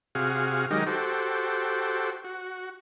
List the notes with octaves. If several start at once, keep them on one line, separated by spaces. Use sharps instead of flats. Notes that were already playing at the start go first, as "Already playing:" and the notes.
C3 F#4 G#4 F5
D#3 F#3 G#3 D#4 G4 A#4
F#4 G4 A4 C5
F#4